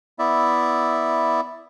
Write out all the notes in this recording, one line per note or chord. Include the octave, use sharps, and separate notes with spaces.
B3 E4 D5 E5